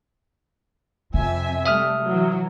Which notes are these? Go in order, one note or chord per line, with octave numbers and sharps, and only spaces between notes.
F2 C3 E5 G#5
G3 A3 E5 D#6 F6
E3 F#3